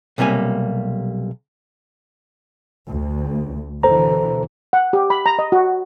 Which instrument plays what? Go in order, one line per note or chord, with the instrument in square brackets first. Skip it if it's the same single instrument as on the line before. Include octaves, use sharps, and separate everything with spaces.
[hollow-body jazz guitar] B1 C3 G3 A#3 G#5
[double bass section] D2
[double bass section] B2 D3 E3 [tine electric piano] A4 C5 A#5
[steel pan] F#5
G4
B5
A#5
D#5
F#4